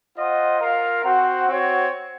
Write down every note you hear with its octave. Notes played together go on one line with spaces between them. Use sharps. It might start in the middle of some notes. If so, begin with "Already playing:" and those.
F4 C5 D#5 F#5
F4 A#4 F5
C4 F#4 C5 F#5
C4 F#4 C#5